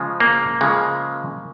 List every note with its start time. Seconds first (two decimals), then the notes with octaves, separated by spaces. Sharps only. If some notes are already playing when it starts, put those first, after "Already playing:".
Already playing: C#3 F3 G#3
0.20 A#3
0.61 C#3 F3 G#3